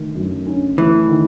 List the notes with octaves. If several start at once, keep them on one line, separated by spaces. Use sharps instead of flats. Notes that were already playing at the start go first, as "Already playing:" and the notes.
Already playing: D#3 A3
F#2
C#4
E3 A3
D#3